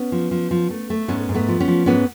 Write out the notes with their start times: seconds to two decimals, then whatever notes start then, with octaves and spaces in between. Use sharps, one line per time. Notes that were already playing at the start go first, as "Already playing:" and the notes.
Already playing: B3 C#4
0.12 F3
0.31 F3
0.51 F3
0.70 A3
0.90 A3
1.08 G#2 B3 C#4
1.29 G#2
1.34 A3 B3
1.48 F3
1.60 B3 C#4
1.68 F3
1.86 G#2 B3 C#4